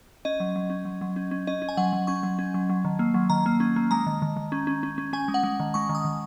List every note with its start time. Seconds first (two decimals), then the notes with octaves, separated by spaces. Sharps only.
0.25 C#4 D#5
0.40 F#3
0.56 F#3
0.70 C#4
0.85 F#3
1.01 F#3
1.16 C#4
1.31 C#4
1.47 C#4 D#5
1.62 C#4
1.69 G#5
1.77 F#3 F#5
1.93 F#3
2.07 C#4 C#6
2.23 F#3
2.39 C#4
2.54 F#3
2.70 F#3
2.85 D#3
2.99 A#3
3.14 F#3
3.30 D#3 A#5
3.46 A#3
3.60 C#4
3.76 A#3
3.91 G#3 A#5
4.06 D#3
4.22 D#3
4.37 D#3
4.52 C#4
4.67 C#4
4.83 C#4
4.98 C#4
5.13 C#4 G#5
5.28 G#3
5.34 F#5
5.43 G#3
5.60 D#3
5.74 G#3 C#6
5.89 D#3
5.95 D#6
6.05 D#3